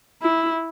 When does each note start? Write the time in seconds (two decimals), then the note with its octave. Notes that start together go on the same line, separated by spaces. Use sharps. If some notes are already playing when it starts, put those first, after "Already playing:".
0.22 E4